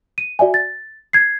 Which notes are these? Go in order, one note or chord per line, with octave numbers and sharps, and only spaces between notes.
D#7
F#4 D5 E5 G#5
A6
G#6 C7